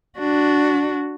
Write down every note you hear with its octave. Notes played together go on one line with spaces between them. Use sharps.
D4 F#4